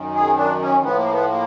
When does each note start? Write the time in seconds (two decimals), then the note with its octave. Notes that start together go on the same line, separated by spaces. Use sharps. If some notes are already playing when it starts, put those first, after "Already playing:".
Already playing: F#2 D#3
0.15 G#4
0.38 D4
0.61 C#4
0.83 A2 F3 B3
0.97 A#3
1.12 B3
1.30 A#3